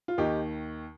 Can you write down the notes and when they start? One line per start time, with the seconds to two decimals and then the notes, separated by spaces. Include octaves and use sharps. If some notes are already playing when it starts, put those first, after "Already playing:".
0.08 F4
0.18 D#2 D#3 D#4 G4